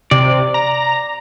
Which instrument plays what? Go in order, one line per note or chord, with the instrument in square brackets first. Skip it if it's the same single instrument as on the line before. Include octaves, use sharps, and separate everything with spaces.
[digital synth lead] C3 [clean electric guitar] D5
[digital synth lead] A#5